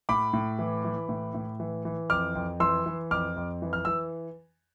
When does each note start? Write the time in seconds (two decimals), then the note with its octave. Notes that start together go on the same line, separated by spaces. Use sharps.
0.09 A2 B5 D6
0.33 A2
0.59 E3
0.85 E3
1.09 A2
1.34 A2
1.60 E3
1.85 E3
2.10 F2 D6 F6
2.35 F2
2.60 E3 C6 E6
2.86 E3
3.11 F2 D6 F6
3.36 F2
3.62 E3
3.73 F6
3.85 E3 E6